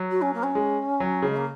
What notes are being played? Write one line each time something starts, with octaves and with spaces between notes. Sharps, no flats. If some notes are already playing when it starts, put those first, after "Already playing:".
Already playing: F#3
F#4
C#4
A#3
C#4
G#3
F#3
C#3 G#3
A#3